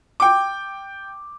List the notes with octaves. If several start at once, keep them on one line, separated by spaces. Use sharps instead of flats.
G5 D6